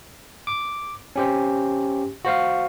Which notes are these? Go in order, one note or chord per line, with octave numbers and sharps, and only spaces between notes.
D6
C#4 G4 C5
F#4 C5 F5